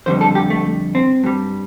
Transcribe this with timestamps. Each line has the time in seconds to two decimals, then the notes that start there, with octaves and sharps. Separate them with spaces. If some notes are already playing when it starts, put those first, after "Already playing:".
0.06 F2 D3 G3 C5
0.21 A4
0.35 G4
0.50 A3
0.95 C4
1.24 G2 G3